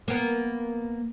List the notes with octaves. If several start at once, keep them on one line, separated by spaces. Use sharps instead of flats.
A#3 B3